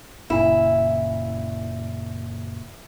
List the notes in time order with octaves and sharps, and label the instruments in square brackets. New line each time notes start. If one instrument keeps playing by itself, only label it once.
[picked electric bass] F#1 A#2 C#3 [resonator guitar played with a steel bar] E4